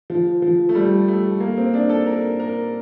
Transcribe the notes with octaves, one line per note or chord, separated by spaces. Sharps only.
F3
F3
A3
G3
A3
A#3
C4
D4
A4
A#4
A#4